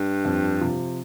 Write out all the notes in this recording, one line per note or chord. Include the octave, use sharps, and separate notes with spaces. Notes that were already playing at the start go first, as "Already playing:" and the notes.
Already playing: G2
F2
C3 F3